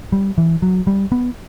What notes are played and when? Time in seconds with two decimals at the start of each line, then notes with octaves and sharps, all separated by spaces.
0.12 G3
0.38 E3
0.62 F#3
0.87 G3
1.12 B3